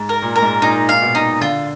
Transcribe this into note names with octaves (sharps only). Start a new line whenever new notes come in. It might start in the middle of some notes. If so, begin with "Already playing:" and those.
Already playing: G#2
A#4
A#2
A#4
G#2
A#2 D#4
F5
B2
D#4
D3 F4